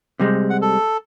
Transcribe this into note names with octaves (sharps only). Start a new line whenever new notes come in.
C3 G3 G#3
F#5
A4